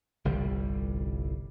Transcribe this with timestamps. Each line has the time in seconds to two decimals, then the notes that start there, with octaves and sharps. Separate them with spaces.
0.25 G1 C2 G3